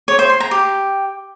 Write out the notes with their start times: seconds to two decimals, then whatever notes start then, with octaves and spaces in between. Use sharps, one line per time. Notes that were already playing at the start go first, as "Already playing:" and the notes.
0.08 C#5
0.19 C5
0.30 C6
0.40 A#5
0.51 G4